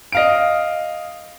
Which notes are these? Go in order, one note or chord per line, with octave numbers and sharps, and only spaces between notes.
D#5 F5 D7